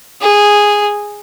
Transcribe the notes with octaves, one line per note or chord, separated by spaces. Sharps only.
G#4